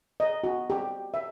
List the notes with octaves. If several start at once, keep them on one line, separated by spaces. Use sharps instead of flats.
D#5
F#4
G4
E5